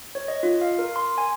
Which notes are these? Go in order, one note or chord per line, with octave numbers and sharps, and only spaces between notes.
C#5
D#5
F4
F5
A#4
C6
G#5